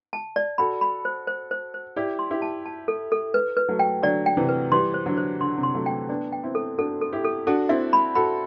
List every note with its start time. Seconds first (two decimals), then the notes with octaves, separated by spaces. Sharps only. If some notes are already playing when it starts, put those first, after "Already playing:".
0.13 A5
0.36 D5
0.58 F#4 A4 B5
0.81 B5
1.05 C5
1.27 C5
1.51 C5
1.74 C5
1.96 E4 G4 D5
2.19 C6
2.31 E4 G4
2.42 A5
2.66 A5
2.88 A4
3.12 A4
3.34 B4
3.57 B4
3.68 F#3 A3
3.79 G5
4.02 D3 F#3 D5
4.26 G5
4.37 C3 E3
4.49 B4
4.71 E3 G3 C6
4.94 C5
5.06 D3 F#3
5.17 C5
5.40 D3 C6
5.58 C3
5.63 C6
5.75 F#3 A3
5.86 G5
6.09 B3 D4 D5
6.32 G5
6.43 C4 E4
6.55 A4
6.78 D4 F#4 A4
7.01 A4
7.13 E4 G4
7.24 A4
7.47 D4 F#4 A4
7.69 C4 E4 E5
7.93 B5
8.15 F#4 A4 B5